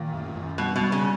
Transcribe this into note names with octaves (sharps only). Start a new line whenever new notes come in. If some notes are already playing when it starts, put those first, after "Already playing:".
Already playing: A#2 D#3
F#2
F#2
B2 G3
B2
G3
C#3